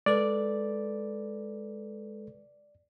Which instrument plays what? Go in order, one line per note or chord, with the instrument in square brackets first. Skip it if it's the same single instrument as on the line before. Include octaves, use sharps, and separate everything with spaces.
[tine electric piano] G#3 A4 B4 [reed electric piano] D5